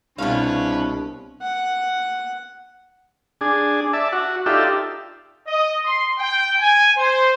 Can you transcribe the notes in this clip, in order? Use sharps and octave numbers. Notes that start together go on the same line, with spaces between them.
C2 B2 C#4 D4 B4 C#5 F5
F#5
D4 G#4
D5 E5 A5
F#4
D#4 F4 G4 A4 D5 E5
D#5
C6
G5
G#5
C5